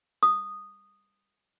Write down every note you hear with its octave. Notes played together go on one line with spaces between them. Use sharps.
D#6